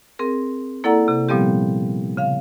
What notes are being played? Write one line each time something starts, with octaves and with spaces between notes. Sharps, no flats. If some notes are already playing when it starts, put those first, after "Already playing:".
C4 G#4 A#4
A#3 E4 A4 D5 F#5 A#5
C3
A#2 F3 G3 B3 C4 G4
C#3 F5